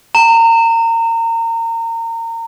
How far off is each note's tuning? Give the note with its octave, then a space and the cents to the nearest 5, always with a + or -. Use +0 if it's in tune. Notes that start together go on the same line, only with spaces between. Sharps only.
A#5 -30